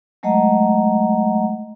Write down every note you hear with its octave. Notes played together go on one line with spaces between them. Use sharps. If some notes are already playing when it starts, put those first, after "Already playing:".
F#3 G#3 A3 D#5 F#5 A#5